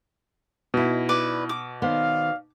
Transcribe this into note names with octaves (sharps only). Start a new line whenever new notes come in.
B2 D#4 E4
B4 D5 D6
D6
D#3 B3 C5 D5 F5